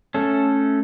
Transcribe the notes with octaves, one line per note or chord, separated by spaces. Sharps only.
A3 C#4 A4